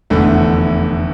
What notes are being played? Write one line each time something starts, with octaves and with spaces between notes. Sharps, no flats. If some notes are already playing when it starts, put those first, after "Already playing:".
F1 E2 D3 A3